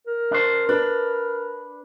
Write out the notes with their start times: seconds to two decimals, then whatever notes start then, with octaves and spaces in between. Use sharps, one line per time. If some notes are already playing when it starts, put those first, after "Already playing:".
0.07 A#4
0.31 D4 C5
0.69 D4 B4